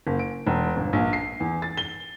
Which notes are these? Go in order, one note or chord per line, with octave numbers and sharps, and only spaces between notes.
F#1
D7
E1
G1
A#1
C7
E2
A6
G7